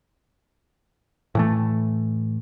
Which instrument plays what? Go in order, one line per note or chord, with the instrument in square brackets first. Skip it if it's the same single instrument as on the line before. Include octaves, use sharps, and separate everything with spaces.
[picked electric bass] A2 E3 A3